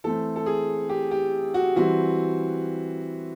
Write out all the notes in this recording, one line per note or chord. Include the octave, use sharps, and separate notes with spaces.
E3 A3 C4 A4
A4
G#4
G4
G4
F#4
E3 G3 C4 F#4